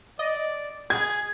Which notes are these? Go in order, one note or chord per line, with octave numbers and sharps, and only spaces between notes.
D5 D#5
G#4 G#6